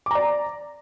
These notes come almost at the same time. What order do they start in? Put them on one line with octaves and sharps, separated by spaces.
D6 A#5 D5